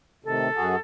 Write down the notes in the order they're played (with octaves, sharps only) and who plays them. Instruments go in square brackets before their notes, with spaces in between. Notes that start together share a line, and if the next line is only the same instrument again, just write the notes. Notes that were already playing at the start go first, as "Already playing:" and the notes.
[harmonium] A2 C3 D#3 [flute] A4
[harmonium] F#2 F#4 G#4